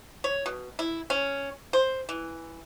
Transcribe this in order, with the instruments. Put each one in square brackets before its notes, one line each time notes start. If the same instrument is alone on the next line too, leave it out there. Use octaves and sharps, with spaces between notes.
[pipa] C#5
B2
E4
C#4
C5
E3